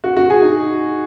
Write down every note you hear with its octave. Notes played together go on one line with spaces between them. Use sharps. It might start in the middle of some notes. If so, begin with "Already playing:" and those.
F#4
F#4
G#4
D#4